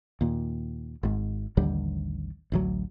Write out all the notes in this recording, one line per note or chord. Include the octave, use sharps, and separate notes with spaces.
D#2 A#2
G#1 G#2
A1 D#2 D3 G3
A1 D2 F#3